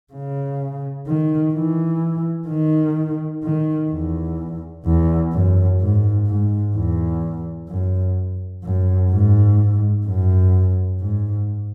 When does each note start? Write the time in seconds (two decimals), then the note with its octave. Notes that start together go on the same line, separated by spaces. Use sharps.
0.13 C#3
1.07 D#3
1.54 E3
2.48 D#3
3.44 D#3
3.92 E2
4.85 E2
5.32 F#2
5.81 G#2
6.27 G#2
6.75 E2
7.69 F#2
8.64 F#2
9.11 G#2
10.06 F#2
11.00 G#2